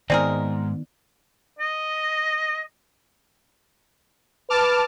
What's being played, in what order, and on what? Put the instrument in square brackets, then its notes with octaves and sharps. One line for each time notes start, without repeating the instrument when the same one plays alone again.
[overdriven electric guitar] G#2 [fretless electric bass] D#3 B3 [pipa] C4 G#4 A#4 [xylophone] D5
[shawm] D#5
[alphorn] B4 [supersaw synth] A5 D6 F6